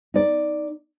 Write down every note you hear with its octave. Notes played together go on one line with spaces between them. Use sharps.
D#4 D5